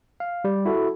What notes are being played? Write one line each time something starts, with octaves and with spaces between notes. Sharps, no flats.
F5
G3
E4 F#4 A4